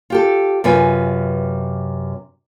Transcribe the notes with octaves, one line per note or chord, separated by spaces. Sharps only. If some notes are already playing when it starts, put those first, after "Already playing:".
F4 G4 A4
F#2 C3 F4 B4 G#5